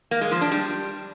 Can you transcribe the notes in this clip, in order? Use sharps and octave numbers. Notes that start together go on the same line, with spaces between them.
A#3
G#3
F3
D4
G3